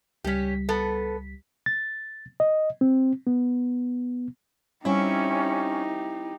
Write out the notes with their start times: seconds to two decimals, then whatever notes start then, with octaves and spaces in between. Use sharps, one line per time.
0.24 C#2 G3 C#4 G4 B6
0.69 B3 A4
1.66 A6
2.40 D#5
2.81 C4
3.27 B3
4.85 G3 C4 C#4 D#4 E4 G4